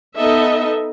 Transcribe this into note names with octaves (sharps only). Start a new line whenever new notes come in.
B3 D#4 A4 D#5 E5